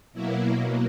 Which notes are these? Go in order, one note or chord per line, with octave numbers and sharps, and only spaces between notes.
B2 F#3 A#3 E4